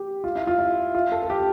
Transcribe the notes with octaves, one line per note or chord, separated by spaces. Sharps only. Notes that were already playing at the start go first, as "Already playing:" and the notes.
Already playing: G4
F4
E4
F4
E4
F4
A4
A4
G4